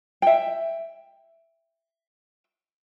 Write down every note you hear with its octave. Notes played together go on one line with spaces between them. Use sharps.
E5 G5